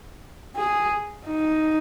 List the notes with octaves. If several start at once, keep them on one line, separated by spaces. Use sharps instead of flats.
G#4
D#4